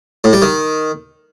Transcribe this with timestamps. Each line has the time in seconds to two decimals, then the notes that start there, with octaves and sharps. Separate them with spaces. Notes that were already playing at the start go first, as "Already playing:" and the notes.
0.24 A2
0.33 G3
0.42 D#3